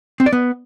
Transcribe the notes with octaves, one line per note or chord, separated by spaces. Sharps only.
C4
D5
B3